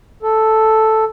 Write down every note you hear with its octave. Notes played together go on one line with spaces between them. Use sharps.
A4